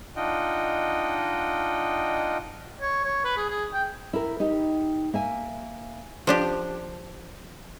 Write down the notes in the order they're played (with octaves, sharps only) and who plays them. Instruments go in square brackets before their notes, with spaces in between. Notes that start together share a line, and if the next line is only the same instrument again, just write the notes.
[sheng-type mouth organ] D4 D#4 F4 D#5 F#5 G5
[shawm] C#5
C#5
B4
G#4
G#4
G5
[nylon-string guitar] E4 A#4
D#4 G4
A#3 E5 G#5
[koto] F3 D4 G4